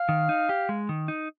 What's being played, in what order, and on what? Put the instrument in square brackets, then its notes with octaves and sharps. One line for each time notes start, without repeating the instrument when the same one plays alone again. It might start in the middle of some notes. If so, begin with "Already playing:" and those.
Already playing: [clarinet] F5
[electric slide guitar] D#3
D#4
G4
G#3
D#3
D#4